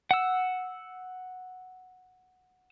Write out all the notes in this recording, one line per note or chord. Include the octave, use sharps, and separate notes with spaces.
F#5 E6